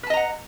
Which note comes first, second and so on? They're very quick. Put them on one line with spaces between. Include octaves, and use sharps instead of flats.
B4 A5 D#5 A#5 F#5